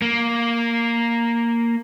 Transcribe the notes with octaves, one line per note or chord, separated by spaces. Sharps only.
A#3